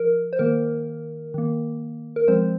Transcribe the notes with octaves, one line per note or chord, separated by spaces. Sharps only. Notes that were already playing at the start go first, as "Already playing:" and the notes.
Already playing: F3 A#4
C5
D#3 A#3 A#4
D#3 A#3
A#4
F3 G#3 C4 C5